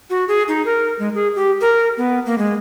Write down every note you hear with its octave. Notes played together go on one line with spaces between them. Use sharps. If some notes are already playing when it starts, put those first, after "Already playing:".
F#4
G#4
D#4
A#4
G#3
G#4
G4
A#4
B3
A#3
G#3